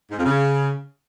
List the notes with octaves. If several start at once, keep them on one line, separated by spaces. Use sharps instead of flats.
G#2
F2
C#3